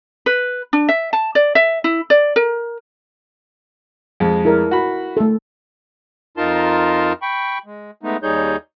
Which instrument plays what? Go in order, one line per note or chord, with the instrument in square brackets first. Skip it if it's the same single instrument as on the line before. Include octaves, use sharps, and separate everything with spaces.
[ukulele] B4
D4
E5
A5
D5
E5
E4
D5
A#4
[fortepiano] F2 G#3
[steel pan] E4 A#4 D5
[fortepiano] F#4 B5
[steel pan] A3 A4
[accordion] F2 D#4 F4 A#4 A5 C6
G5 B5 C#6
G#3
G#3 A3 B3 D#4
D#2 G3 D#4 G#4 C#5 G6